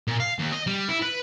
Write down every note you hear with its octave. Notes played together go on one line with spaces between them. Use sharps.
A#2
F5
D#2
D#5
G3
E4
B4